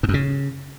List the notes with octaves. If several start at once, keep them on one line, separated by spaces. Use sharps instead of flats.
G#2
F#2
C#3